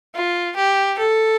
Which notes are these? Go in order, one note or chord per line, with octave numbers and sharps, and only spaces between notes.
F4
G4
A4